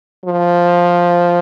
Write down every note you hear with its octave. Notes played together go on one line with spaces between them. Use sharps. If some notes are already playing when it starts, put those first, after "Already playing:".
F3